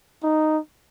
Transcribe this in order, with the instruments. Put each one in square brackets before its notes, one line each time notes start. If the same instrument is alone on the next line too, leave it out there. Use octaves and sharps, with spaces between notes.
[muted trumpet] D#4